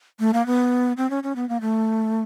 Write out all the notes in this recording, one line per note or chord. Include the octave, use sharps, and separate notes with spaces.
A3
A#3
B3
C4
C#4
C#4
B3
A#3
A3